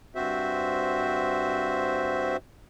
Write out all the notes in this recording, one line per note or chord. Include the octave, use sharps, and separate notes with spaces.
G2 C4 F#4 C5 E5